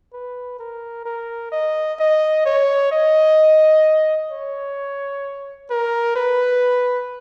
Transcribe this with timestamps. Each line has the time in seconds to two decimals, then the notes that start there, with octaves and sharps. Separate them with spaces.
0.13 B4
0.59 A#4
1.05 A#4
1.52 D#5
1.99 D#5
2.46 C#5
2.92 D#5
4.31 C#5
5.70 A#4
6.16 B4